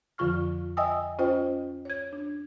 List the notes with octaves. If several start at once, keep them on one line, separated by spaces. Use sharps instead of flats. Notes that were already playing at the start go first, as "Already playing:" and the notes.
F2 D3 F3 F4 C#6 F6
D#5 E5 G5 G#5 D#6 E6
C#4 F4 C5 D#5 G5
C#5 G#6
D4